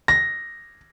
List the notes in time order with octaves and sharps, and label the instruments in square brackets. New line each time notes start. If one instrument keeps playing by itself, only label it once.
[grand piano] A#6